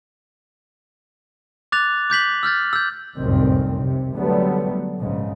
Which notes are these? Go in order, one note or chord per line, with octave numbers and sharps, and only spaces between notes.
D6 F#6 A6 F7
D6 G6 B6 F#7
E6 F6 G6 A6
E6 G6
F1 C2 F#2 A2 D#3 C4
C3
D3 F#3 G3 A3 B3
A#1 G#2 C#3